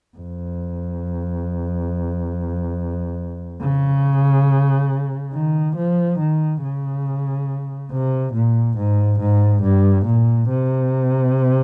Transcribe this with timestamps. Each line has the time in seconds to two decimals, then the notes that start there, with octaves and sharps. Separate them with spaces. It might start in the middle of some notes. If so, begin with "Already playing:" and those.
0.17 F2
3.61 C#3
5.34 D#3
5.76 F3
6.19 D#3
6.62 C#3
7.91 C3
8.34 A#2
8.78 G#2
9.21 G#2
9.63 G2
10.06 A#2
10.49 C3